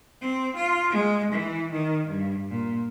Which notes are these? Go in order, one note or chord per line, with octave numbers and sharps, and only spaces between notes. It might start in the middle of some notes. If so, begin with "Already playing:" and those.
C4
F4
G#3
E3
D#3
G2
A#2